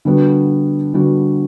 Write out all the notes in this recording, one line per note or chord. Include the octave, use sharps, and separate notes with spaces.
D3 G3 B3 F#4
D3 G3 B3 F#4